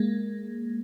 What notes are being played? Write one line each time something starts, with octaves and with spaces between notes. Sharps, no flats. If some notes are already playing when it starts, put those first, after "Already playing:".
Already playing: G#3 A#3